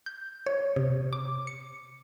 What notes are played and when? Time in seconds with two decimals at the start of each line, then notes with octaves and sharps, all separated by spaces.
0.06 G6
0.46 C#5
0.76 C3
1.13 D6
1.47 C#7